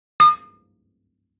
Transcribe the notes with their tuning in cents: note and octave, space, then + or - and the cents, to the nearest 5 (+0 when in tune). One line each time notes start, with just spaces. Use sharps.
D#6 -40